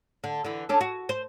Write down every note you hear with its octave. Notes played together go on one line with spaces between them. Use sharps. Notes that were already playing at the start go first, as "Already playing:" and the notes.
D3
D3 E3
C#4 D4 A4
F#4
C5